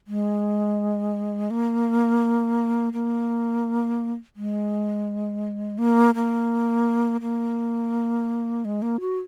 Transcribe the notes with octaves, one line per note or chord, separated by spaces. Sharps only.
G#3
A#3
A#3
G#3
A#3
A#3
A#3
G#3
A#3
F#4